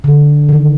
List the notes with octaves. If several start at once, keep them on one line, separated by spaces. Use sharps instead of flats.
D3
D#3